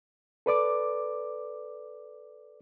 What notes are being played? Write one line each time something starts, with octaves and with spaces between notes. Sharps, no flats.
A4 B4 D5 D6